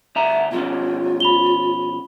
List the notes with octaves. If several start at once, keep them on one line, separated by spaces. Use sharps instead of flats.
D2 E5 A#5
B2 F3 C#4 F4
B5 F7 G7